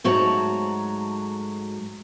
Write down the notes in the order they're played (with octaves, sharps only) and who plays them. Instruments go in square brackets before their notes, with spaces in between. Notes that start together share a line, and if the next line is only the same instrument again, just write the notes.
[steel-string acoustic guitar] G#2 F#3 A3 F#4 A5 A#5